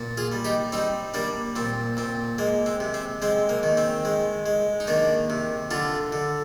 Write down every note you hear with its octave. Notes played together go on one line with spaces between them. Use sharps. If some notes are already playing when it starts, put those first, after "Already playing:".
Already playing: A#2
F4 G#4
G3
D#4 G4
G3 C4 D#4
G3 A#3 D4
A#2 C4
A#2 C4
G#3 A#3
C4
C3
C4
G#3 C4
A#3
D#3
C4
G#3
G#3
D#4
D#3 A#3 D4
C3
D3 D4 F4
D3